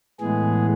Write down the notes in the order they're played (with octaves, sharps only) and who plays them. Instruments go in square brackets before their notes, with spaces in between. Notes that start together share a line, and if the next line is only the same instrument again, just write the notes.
[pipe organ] A2 E3 G#3 B3 G#4